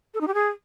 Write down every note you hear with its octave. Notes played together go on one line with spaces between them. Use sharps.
A4
D#4
G4
G#4